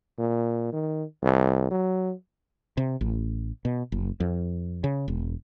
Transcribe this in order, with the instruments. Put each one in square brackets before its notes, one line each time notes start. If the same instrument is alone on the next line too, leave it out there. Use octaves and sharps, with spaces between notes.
[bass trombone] A#2
D#3
C2
F#3
[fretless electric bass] C3
A1
B2
F#1
F2
C#3
E1